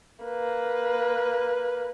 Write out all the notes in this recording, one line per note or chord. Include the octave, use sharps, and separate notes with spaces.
A#3 B4